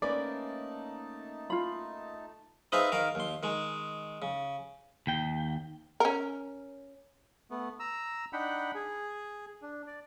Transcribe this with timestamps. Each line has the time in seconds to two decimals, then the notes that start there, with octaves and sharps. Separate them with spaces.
0.02 A3 A#3 C#4 D#4 B4 D5 A5
1.50 F4 B5
2.72 C4 D#4 G#4 B4 E5 F5
2.92 D#3 A#4 F5
3.15 D#2 C6
3.43 D#3 G#3
4.22 C#3
5.07 D#2 G5
6.00 C#4 A#4
7.51 A3 B3
7.80 A#5 E6
8.33 D4 D#4 F#5 G5 B5
8.75 G#4
9.62 D4
9.87 D5